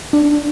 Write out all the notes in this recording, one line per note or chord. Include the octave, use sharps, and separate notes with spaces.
D4